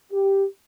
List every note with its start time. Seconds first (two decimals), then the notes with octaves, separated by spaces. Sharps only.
0.13 G4